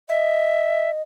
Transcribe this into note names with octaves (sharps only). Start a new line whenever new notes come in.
D#5 E5